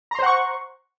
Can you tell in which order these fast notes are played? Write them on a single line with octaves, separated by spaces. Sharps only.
A#5 C6 C5 F#5 C#6